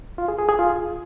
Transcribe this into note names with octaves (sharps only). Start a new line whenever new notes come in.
F4
G#4
G#4
G#4
F4